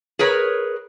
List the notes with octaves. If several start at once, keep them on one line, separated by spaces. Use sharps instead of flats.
G#4 A#4 B4 C#5